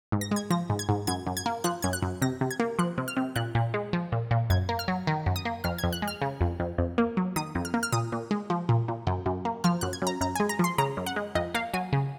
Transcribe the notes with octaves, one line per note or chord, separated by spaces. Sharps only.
G#2
A#6
G#3 G#6
F3 A#6
G#2
G#6
G#2
F#2 G#6
F#2
G#6
A#3
F3 F#6
F#2 G#6
F#6
F#2
C3 A#6
C3
G#6
A#3
F3 F#6
C3
F6
C3
A#2 F#6
A#2
G#3
F3
A#2
A#2
F#2 G#6
A#3
F6
F#3
D#3
F#2
D#6
A#3
F2 F6
F2 G#6
F#6
G#3
F6
C#3
F2
F2
F2
A#3
F#3
D#3 D#6
F2
F6
A#3
F6
A#2 D#6
A#2
G#3
F3
A#2
A#2
F#2
F#2
A#3
F3 F6
F#2 F#6
G#6
F#2 A#5
F#2 A#5
G#3 G#5
A#5
F3 C6
C#3 A#5
F#2
F#5
G#3
F2 D#5
A#3 F5
F#3 G#5
C#3